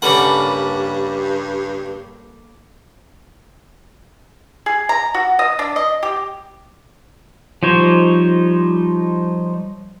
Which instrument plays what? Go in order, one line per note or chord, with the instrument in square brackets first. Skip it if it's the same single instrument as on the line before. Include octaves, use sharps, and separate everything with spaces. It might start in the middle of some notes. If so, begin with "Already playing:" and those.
[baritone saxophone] G2 [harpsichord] C#3 G3 F#5 [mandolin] A#3 A4 B4 [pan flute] G4
[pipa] G#4
A#5
F#4
D#5
D4
D#5
G4
[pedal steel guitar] F3 G3 D#4 C5 C#5